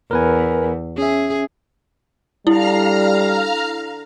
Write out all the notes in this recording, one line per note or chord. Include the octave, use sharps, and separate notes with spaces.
E2 A#4 B4 G#5
C#4 G#4 E5
D3 G3 E4 F5 A#5 F6